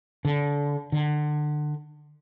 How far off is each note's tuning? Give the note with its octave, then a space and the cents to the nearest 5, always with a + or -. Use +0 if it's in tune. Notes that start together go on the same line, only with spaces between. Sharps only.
D3 -25
D3 +25